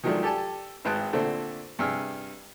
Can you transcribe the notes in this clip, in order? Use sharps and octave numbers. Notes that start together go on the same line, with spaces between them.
D#3 F3 F#3 G#3 A3 D4
G4 A4 D5 G#5 A5
G#1 G#3 B4 G5 A5 F#6
A#2 D3 A3 C4 A4
G2 C3 G#4 E6 F6